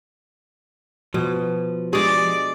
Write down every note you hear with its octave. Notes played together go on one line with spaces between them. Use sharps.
B2 F3
G#3 D4 G4 G#4 D5